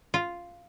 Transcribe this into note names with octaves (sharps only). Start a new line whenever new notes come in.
F4